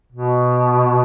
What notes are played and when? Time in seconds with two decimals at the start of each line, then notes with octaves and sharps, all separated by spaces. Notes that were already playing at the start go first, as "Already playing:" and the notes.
0.12 B2